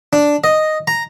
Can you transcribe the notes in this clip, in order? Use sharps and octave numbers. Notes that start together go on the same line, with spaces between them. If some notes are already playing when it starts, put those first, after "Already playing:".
D4
D#5
A#5